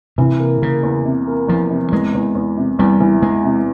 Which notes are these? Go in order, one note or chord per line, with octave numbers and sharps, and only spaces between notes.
C3 E3
A#3
C#3 A#3
E2
C3
A#3
E2 F3
C3
E2 G#3
E2
E2
C3
E2 G3
E3
E3 G#3
C3